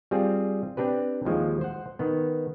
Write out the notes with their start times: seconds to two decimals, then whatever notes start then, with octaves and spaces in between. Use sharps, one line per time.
0.11 G3 C4 F4 G#4
0.77 C4 D4 G4 B4
1.25 D#2 F3 G#3
1.61 C5 F#5
1.99 D#3 B3